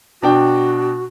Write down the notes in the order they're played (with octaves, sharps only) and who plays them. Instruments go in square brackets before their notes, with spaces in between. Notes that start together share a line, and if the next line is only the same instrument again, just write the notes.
[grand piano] B2 D4 G5 [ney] F#4